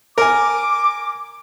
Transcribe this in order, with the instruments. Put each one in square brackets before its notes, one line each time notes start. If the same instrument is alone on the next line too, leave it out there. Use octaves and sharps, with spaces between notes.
[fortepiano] A#4 G#5 [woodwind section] D6